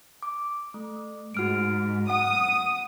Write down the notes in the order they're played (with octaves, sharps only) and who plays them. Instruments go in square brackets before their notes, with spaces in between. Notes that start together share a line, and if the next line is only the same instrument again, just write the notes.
[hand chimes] D6
A3
[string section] G#2 [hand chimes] F#4 F6 D7
[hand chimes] F#5 [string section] D#6